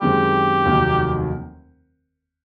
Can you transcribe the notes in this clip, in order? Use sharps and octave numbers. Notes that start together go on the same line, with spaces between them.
F#2 D#3 G#3 C4 G4
F1 D#2 D#3 F#3 A#3